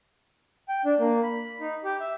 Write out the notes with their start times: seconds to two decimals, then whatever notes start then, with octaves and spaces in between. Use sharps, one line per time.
0.68 G5
0.85 D4
0.99 A#3
1.23 B5
1.61 D#4
1.84 G4
2.00 E5